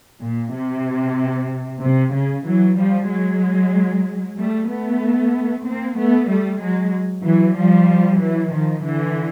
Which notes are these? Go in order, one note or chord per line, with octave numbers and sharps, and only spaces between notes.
A#2
C3
C3
C#3
E3 F#3
F3 G3
F#3 G#3
G3 A3
A3 B3
A#3 C4
A3 B3
G3 A3
F#3 G#3
E3 F#3
F3 G3
E3 F#3
D#3 F3
D3 E3